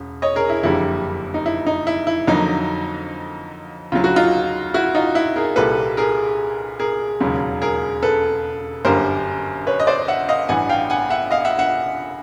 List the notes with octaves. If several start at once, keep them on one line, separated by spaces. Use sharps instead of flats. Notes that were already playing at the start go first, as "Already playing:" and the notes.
Already playing: E1 C#3
C#5 D#5
G#4 A#4
E4
F#1 F2 D3 G3 A#3 E4
D#4
E4
D#4
E4
E4
F2 D3 F#3 A#3 D#4
D2 C#3 F#3 F4
F#4
D#4 F4
E4 F#4
D#4 F4
E4
G#4 A#4
C2 A#2 G3 A#3 A4 B4
G#4 A#4
G#4 A#4
E1 D#2 C#3 F#3
G#4 A#4
A4 B4
G1 F#2 D3 G3 A#3 A#4 C5
B4 C#5
D#5
C5 D5
E5 F#5
D#5 F5
A1 G2 E3 F#5 G#5
F5 G5
F#5 G#5
E5 F#5
D#5 F5
E5 F#5
E5 F#5